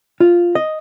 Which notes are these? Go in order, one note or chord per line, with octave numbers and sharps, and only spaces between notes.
F4
D#5